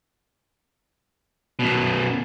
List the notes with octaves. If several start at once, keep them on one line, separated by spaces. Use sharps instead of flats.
F#2 B2